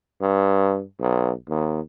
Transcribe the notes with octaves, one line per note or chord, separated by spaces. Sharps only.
G2
B1
D#2